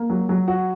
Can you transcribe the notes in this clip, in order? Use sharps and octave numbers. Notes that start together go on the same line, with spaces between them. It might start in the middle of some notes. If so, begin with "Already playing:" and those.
Already playing: A#3
F#3
F#3
F#4